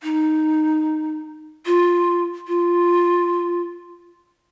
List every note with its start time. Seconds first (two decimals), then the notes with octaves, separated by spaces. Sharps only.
0.03 D#4
1.66 F4
2.48 F4